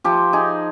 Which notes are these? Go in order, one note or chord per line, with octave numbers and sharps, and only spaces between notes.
F3 G4
D#4 G#4